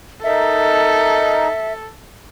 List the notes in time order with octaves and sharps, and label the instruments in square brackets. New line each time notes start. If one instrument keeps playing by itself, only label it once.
[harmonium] D#4 A#4 [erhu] A4 [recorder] E5